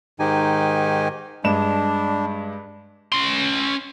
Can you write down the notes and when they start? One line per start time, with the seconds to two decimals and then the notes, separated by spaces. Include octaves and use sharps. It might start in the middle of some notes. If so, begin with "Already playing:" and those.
0.19 G#2 D#3 D#4 G4 G#5
1.44 G2 G#3 D4 E7
3.12 C#4 C6